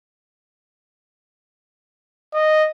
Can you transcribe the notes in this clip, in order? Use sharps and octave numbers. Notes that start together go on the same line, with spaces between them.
D#5